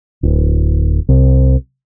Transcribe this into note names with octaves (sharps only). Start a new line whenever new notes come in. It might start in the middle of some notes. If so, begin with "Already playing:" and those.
D1
C2